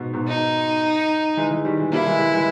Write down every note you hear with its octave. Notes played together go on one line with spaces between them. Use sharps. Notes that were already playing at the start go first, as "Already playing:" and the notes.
Already playing: G#2 B2
G#2 B2
D#4
E3 G#3
E3 G#3
D#3 G3
E3 G#3
G3 A#3 E4
E3 G#3
E3 G#3
E3 G#3